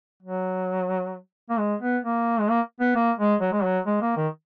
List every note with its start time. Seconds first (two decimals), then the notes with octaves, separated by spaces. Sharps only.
0.23 F#3
1.50 A#3
1.59 G#3
1.82 B3
2.05 A#3
2.40 G#3
2.50 A#3
2.81 B3
2.96 A#3
3.18 G#3
3.41 F#3
3.52 G#3
3.63 F#3
3.86 G#3
4.02 A#3
4.17 D#3